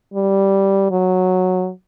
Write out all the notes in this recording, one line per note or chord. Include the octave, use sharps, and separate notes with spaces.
G3
F#3